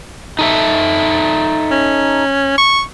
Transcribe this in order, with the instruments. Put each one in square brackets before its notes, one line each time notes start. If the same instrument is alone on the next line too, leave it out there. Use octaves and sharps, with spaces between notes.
[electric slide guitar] D#4 A4 E5
[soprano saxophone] C#4
C#6